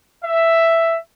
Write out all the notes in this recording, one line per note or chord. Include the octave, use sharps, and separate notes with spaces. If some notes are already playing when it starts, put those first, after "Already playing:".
E5